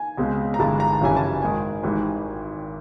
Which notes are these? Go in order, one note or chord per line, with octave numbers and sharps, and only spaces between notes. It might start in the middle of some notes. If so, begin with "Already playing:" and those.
Already playing: G#5
C#2 B2 G#3 C4
A#5
G1 G2 E3 G#3 A5
A#5
A5
G#1 F#2 C#3 E3 G3 G#5
A5
G#1 G#2 D#3 G#5
G#1 G#2 E3 G3